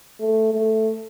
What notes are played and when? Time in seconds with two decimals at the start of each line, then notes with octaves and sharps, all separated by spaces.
0.20 A3
0.54 A3